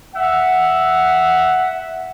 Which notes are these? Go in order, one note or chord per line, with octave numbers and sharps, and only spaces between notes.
E5 F#5